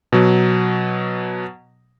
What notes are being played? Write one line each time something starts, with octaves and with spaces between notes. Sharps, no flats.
B2 F#3